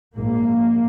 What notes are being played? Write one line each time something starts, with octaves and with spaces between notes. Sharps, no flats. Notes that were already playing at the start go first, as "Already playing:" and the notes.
A#1 G#2 A#3